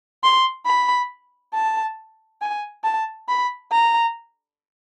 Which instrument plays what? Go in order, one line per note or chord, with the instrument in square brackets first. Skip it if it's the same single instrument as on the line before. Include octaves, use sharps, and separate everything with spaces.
[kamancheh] C6
B5
A5
G#5
A5
B5
A#5